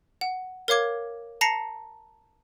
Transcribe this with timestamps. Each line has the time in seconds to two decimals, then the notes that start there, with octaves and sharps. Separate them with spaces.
0.21 F#5
0.68 A#4 C#5 F5 D6 G#6
1.41 A5 A#5 A#6 C7 C#7